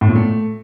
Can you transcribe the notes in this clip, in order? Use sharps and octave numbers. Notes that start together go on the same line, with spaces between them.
A2
A#2
A3